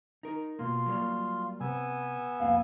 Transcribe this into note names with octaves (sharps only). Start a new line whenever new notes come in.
D#4 A#4
B2 A#3 F4
F#3 G3 A#3
C3 B3 G#5 E6
C2 F2 A#3 F5